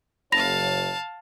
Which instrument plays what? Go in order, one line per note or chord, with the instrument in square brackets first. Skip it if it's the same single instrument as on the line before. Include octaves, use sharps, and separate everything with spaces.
[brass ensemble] F#1 C#5 [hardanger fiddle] F5 A5 [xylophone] B5 A#6 F7